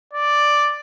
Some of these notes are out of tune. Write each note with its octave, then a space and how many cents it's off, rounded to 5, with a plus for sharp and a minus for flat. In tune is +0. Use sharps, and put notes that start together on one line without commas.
D5 +0